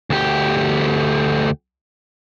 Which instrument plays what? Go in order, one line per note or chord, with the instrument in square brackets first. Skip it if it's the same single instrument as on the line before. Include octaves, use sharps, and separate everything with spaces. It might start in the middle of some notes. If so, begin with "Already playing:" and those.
[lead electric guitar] D2 G4